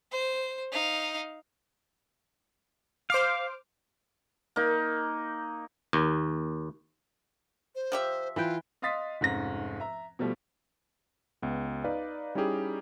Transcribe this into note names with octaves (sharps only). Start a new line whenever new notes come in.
C5
D#4 F5
C5 F5 D6 F6
A#3 D#4
D#2
C5
F3 G4 E5
E3 F4 B4 G5
D#5 F5 C6 D#6 A6 B6
F1 G#2 C#4 A#6
E5 A#5
B2 F3 G3 A3
C#2 B3
D#4 B4 D5 F5
G3 C#4 D#4 E4 G4 G#4